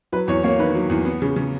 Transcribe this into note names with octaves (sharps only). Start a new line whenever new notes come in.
F#3 B4
E2 C#5
A#3 C#5
D#3 B4
F#3
E2
B3
C#3
C#3